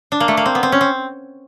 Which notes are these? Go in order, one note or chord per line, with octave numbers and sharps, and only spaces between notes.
D4
A#3
A3
A#3
C4
B3
C4
C#4
C4